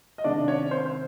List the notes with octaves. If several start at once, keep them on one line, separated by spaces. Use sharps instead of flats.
D#5
C3 D#3 G#3 D4 D5
C#4 C#5
C4 C5
C5